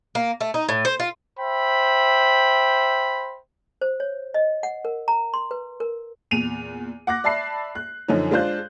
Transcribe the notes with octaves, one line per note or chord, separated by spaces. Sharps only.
A#3
A3
D#4
A2
C5
F4
C5 E5 G5 B5
C5
C#5
D#5
F#5
A#4
A#5
C6
B4
A#4
E2 A#2 D#7 F7
F#5 D6 F#6 A#6
D5 E5 A5 B5 C7
F#6
F#2 D3 F3 C#4 D#4
G#3 D4 F4 C5 F#6 G6